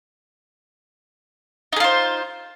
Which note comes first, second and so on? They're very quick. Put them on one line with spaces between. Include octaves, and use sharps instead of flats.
D#4 G#4 F4 C5